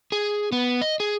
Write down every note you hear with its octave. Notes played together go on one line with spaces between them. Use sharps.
G#4
B3
D#5
G#4